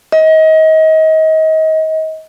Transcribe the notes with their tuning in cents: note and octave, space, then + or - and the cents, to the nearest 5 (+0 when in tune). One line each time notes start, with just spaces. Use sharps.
D#5 +30